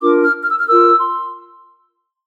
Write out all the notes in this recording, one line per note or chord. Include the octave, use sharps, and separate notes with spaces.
D4 F4 A#4 D6
F6
F6
E6
F6
F4 A#4 E6
C6